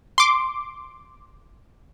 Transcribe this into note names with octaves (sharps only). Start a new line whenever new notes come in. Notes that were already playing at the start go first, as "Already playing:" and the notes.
C6 D6